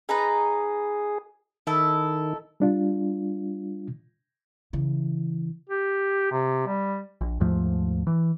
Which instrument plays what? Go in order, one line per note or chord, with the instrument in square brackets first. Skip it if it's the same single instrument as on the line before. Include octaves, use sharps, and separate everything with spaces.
[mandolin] D#4 B4 A#5 [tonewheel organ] G#4
[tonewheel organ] D#3 [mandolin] D#4 E4 A4
[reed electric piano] G3 D4 F4
[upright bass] C#3 E3
[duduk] G4
C3
G3
[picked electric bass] A#1
D#2 G#2 F3 A3
E3